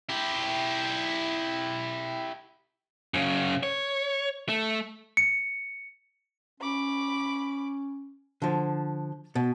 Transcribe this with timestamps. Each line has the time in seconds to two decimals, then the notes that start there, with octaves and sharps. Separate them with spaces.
0.09 E4 G4
3.14 F#2 C#3
3.63 C#5
4.49 A3
5.17 C#7
6.60 C#4 B5 D6
8.42 D3 F3
9.35 B2